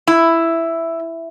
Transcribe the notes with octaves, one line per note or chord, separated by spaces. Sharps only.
E4